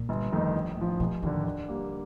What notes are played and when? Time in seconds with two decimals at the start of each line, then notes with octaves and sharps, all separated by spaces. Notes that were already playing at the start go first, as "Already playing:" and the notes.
Already playing: A#2
0.09 G1
0.32 F2 D#3 A3 D#4
0.54 A#1
0.77 A2 F3
1.00 F1 A#2
1.23 D#2 A2 D3
1.45 D3
1.68 G3 A#3